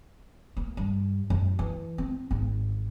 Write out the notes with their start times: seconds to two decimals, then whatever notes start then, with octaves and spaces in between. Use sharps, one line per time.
0.57 A#3
0.77 G2
1.30 F#2
1.59 E3
1.98 C4
2.31 G#1